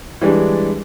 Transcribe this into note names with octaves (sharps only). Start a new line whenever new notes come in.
E3 G3 G#3 D4